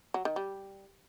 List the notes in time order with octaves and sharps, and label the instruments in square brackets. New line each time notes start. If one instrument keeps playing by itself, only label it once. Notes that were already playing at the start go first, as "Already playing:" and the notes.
[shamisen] F#3
D#3
G3